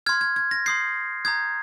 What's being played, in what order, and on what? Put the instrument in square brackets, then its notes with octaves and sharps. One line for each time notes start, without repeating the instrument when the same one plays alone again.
[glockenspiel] C6 F6 G#6
G#6
G#6
A#6
C6 D#6 G6 C7
A#5 D#6 G6 G#6